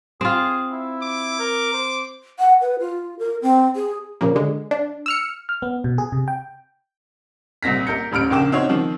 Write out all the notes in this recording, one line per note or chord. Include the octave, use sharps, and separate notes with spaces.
C4 F4 G#4
E4
D6
A#4
C5
F#5
B4
F4
A#4
C4
G#4
A#2 C#3 F3 A#3
D3 G#3
D4
E6 F6 C#7
F6
B3
B2
G#4
C3
G5
C2 A#2 C4 A#6 B6
A#3 A#4 G6 C#7
D#1 A1 B5 F6 D7
A#1 C#3 A#3 G5 D6 E7
C4 D#4 F#4 C5 C#5
D#3 F3 C4